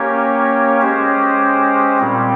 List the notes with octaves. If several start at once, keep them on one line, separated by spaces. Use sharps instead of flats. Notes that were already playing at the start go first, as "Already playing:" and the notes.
Already playing: A#3 C#4 G4 C#5
G#3 C#4 G4 C5
A#2 G3 C4